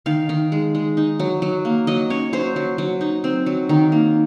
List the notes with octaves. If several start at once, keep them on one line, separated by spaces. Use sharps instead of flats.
D#3 F5
D#3
G#3
G#3
D#4
F#3
F#3
A#3
F#3 D#5
C#4 C#5
F#3 C5
F#3
F#3
D#4
C4
F#3
D#3
A#3